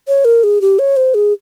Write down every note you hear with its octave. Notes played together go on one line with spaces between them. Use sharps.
C#5
A#4
G#4
G4
C#5
C5
G#4